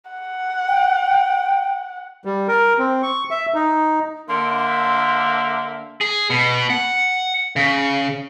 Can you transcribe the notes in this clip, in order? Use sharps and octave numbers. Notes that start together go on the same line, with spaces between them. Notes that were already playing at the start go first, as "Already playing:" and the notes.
F#5
G5
G3
A#4
C4
C#6
E5
D#4
D3 A#3 E5 C6
G#4
B2
F#5
C#3